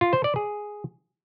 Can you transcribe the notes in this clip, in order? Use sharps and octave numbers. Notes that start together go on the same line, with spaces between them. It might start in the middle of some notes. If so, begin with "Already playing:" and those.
F4
C5
D5
G#4